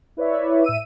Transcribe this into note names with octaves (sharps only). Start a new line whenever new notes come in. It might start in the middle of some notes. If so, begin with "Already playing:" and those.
E4 B4 C#5 D5 E5
A2 E5 E6 D#7